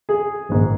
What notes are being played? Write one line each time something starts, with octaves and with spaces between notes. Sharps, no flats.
G#4
A#1 G#2 D#3